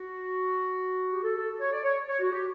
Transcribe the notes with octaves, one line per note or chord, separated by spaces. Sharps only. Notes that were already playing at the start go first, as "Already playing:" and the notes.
Already playing: F#4
G4
A4
A4
C#5
D5
C#5
C#5
F#4
G4